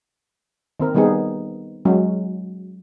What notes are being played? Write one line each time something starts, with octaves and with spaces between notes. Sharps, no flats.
D#3 C4 A#4
D#3 G3 B3 D#4 G#4
F#3 G#3 C#4 F#4